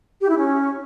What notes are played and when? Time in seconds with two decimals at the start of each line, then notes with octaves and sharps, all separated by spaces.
0.21 G4
0.29 E4
0.37 C#4